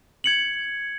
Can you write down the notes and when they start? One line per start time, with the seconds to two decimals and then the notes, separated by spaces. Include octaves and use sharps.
0.24 G#6 C#7 F#7